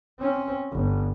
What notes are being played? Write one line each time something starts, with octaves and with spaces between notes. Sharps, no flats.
C4 C#4
G1